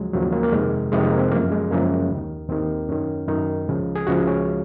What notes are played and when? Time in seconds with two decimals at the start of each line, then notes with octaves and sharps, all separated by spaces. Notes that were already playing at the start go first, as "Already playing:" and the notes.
Already playing: D#2 C#3 F3 F#3 G#3
0.13 D#2 C#3 F3 F#3
0.23 A#3
0.33 A#3
0.43 A#3
0.52 F2 C3 D#3 G#3
0.92 F2 C3 D#3 G#3
1.05 A#3
1.18 C4
1.32 F#2 C#3 F3 A#3
1.52 G#3
1.71 F#2 C#3 F3 A#3
2.10 D#2 D#3
2.49 D#2 D#3 C4
2.88 F#2 D#3 C#4
3.28 F#2 D#3 D#4
3.68 C#2 C#3 F3
3.96 G#4
4.07 C#2 C#3 F3 F#4
4.28 C#4